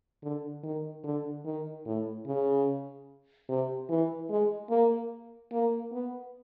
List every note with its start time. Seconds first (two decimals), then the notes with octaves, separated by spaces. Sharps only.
0.23 D3
0.64 D#3
1.04 D3
1.45 D#3
1.86 A2
2.27 C#3
3.49 C3
3.89 E3
4.30 G#3
4.70 A#3
5.53 A#3
5.92 B3